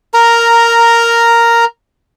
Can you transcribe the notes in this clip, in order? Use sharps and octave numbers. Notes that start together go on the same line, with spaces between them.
A#4 A#5